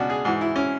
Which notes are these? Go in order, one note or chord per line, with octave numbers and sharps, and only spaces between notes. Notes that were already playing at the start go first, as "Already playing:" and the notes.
Already playing: C#2 B2 C#4 D4 F#4
G#4
G#2 E3 F#4
E4
C#4